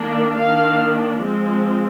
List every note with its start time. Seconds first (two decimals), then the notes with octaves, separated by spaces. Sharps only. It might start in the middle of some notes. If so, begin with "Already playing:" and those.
Already playing: D#3 A#3 D4
0.38 D#3 A#3 D4 F5
1.21 F3 G#3 C4